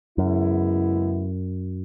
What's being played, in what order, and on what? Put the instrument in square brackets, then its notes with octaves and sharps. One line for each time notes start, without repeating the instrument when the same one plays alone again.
[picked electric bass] F#2 [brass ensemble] C#3 G#3 B3 E4